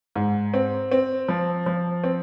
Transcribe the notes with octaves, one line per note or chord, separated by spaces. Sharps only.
G#2
C4
C4
F3
F3
C4